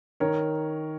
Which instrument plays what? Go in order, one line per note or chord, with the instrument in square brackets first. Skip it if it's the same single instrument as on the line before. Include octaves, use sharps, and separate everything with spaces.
[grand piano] D#3 A#4 C#5